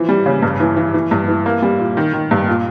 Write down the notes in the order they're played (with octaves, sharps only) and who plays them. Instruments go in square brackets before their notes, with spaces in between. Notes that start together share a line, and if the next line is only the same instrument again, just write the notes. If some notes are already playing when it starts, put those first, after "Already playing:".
Already playing: [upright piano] E3 F3
G3
C#3
G2
E3
E3
E3
G2
E3
A#3
G3
A#2
D#3
D#3
G2
A#2